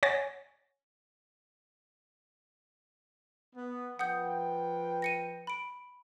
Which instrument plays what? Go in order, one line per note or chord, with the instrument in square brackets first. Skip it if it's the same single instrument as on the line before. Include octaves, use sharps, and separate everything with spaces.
[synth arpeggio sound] C#5 F#5 G#5 A6 A#6
[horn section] B3
[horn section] F3 B4 G5 [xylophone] F#5 D#6 G6
[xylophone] A#6 C#7 D#7
B5 D7